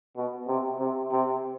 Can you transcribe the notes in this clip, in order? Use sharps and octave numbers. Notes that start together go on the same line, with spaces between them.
B2
C3
C3
C3